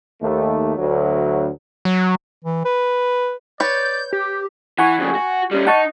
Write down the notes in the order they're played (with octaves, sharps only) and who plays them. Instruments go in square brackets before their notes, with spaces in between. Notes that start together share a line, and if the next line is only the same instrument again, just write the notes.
[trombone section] D#2 A3
D2 F#3
[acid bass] F#3
[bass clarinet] E3
B4
[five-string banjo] B4 C#5 [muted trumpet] D5 [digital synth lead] G6
[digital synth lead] G4 [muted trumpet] G5
[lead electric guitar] E3 [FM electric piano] F#5 G#5 C#6
[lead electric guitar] F2 C#3
F#4
G3 C#4
[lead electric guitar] D#4 [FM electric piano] F#5 A5 C#6